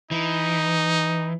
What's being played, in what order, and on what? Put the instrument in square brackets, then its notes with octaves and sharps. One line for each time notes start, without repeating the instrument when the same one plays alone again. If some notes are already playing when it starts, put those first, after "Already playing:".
[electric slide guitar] E3 [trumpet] D#4